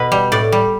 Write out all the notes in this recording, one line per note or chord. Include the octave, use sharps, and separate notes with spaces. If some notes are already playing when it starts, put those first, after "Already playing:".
Already playing: B2 B4
G3
A2 D5
G3